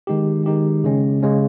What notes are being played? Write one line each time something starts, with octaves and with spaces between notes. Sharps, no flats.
D#3 G#3 D#4 G4
D#3 G#3 D#4 G4
C#3 G#3 C#4
C#3 G#3 C#4